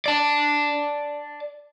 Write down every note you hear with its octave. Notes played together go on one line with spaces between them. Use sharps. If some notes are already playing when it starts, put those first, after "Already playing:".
D5 A5